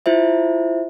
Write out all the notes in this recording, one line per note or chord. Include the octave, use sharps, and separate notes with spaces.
E4 F4 C5 E5